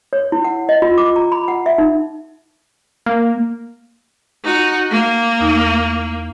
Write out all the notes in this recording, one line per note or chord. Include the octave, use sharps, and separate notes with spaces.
C#5
E4
F#5
D#5
F4
D6
A#5
B5
F#5
E5
D#4
A#3
D#4 F#4
A#3
E2 D#4